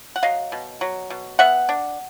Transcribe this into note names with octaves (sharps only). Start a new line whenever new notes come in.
F#5
F#3 D#5 F5
B2
F#3
B2
B3 E5 F#5
D4